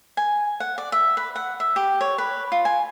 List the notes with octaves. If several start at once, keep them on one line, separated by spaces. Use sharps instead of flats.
G#5
F#5
D5
E5
B4
F#5
E5
G4
C#5
B4
F4
G#5